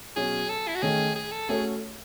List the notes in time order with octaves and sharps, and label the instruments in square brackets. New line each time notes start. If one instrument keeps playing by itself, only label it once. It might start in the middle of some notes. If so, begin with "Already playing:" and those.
[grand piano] B2 F#3 C#4 F#4 [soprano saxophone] G#4
[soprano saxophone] A4
E4
F#4
[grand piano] D#3 A3 C#4 [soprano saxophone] G#4
[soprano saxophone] G#4
A4
[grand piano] A3 C#4 F#4 A4 C#5 [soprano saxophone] G#4